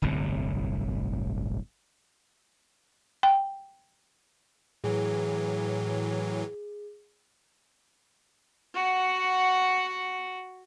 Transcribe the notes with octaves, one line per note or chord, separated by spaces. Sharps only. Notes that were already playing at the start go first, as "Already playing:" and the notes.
D1 G1 C2 A2
G5
A2 E3 F#3 G#4
F#4 F#5